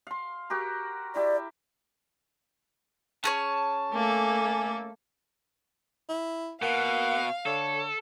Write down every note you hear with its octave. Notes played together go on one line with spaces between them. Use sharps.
F5 C6
F#4 G4 A#4
E4 G4 D5
C#4 G#4 C#5 A5
A3 A#3 A4 G#5 D6
E4
B2 A#3 F5 F#5
D3 A4 C#5